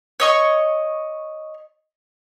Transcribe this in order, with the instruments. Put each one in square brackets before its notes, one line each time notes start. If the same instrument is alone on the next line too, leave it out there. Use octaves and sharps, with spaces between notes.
[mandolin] C#5 D#5 C#6